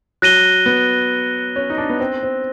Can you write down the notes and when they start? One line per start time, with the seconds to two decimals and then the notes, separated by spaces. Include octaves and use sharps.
0.22 F#3 F#6 A#6 D#7 G7
0.66 B3
1.56 C#4
1.70 D#4
1.78 D4
1.90 B3
2.00 C4
2.23 C4